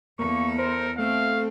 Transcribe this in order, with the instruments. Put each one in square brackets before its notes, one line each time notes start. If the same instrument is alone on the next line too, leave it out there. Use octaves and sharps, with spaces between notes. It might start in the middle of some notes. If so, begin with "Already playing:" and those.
[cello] E2 A4 [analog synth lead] A#3 [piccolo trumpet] C#6
[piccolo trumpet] A#4 [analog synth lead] C5
[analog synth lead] A3 [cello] C4 [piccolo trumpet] F5